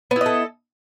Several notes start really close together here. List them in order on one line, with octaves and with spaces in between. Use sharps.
B3 E4 D#5 A4